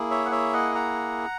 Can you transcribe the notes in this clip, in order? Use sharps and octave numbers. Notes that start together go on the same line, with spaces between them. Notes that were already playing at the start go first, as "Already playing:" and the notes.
Already playing: A#3 E4 G#4
C#5 E5
F#5
C#5 E5
D#5 F#5
F#5 A#5